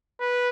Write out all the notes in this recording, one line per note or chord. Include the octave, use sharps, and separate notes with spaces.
B4